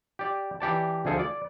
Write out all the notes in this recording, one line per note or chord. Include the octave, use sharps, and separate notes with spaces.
G4 D5
E3 G4 D5 A5
D2 F3 G#4 A4
D5